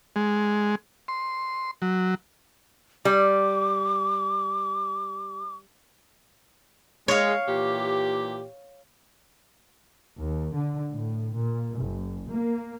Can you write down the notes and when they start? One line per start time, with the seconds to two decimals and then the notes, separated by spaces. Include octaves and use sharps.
0.16 G#3
1.08 C6
1.82 F#3
3.05 G3 D6
7.08 G#3 C#5 F5
7.48 A#2 E3 G4
10.18 D#2
10.55 D3
10.91 A2
11.33 A#2
11.78 F#1
12.28 A#3